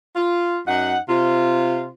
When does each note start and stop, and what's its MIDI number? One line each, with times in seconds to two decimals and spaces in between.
0.16 0.60 65
0.68 0.98 42
0.68 0.98 63
0.68 0.98 78
1.09 1.89 48
1.09 1.89 60
1.09 1.89 65